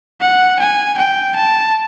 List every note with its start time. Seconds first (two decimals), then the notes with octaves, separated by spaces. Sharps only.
0.21 F#5
0.59 G#5
0.98 G5
1.36 A5